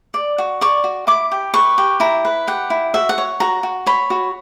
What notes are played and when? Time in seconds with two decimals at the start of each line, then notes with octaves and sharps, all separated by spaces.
0.14 D5
0.38 F#4
0.61 D5 C#6
0.84 F#4
1.07 E4 D6
1.32 G4
1.54 B4 C#6
1.78 G4
2.00 E4 A#5
2.25 B4
2.47 G4 F#5
2.70 E4
2.94 F#4 E5
3.09 F#5
3.18 C#5
3.40 F#4 A#5
3.63 F#4
3.86 C#5 B5
4.10 F#4